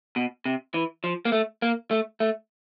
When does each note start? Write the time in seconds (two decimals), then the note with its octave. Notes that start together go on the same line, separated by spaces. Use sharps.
0.16 B2
0.46 C3
0.74 E3
1.04 F3
1.25 A#3
1.32 A3
1.62 A#3
1.91 A3
2.20 A3